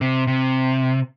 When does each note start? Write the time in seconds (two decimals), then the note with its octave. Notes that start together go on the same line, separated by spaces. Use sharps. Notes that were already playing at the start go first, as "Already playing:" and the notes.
0.01 C3
0.27 C3